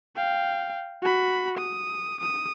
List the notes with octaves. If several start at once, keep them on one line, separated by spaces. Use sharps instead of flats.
F5 G5
F#4 B5
D#6
D#6